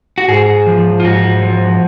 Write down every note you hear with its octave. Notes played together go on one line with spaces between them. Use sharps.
F#4
G#2 G#4
F3
F4
G#2 F#4
F3